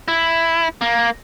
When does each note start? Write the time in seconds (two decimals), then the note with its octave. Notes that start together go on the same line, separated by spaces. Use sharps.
0.08 E4
0.81 A#3